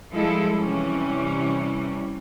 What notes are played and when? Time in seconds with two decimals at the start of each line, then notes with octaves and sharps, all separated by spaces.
0.13 F3 G3 G#3 E4 A4
0.59 C3 E3 G3 C#4